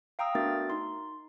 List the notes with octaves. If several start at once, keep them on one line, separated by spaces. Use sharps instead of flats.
F5 G5 A#5 D#6 E6
A3 B3 D4 F#4 A#4 A6
D#4 C6